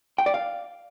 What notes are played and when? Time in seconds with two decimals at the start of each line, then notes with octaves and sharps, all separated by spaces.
0.18 G5
0.26 D5
0.34 F5